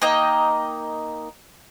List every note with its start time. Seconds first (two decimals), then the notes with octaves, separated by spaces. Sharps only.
0.02 A#3 D#4 D#5 G5